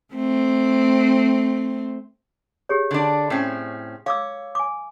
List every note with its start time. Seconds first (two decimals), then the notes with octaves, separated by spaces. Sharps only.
0.15 A3 C4
2.69 G4 G#4 C#5
2.91 D3 D4
3.30 A2 C4 C#4
4.06 C#5 F5 D6 E6
4.55 G#5 D6